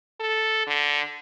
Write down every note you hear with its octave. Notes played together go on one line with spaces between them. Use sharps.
A4
D3